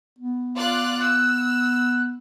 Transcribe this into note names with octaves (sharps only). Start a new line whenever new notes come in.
B3
F4 D5 F#6
E6 F#6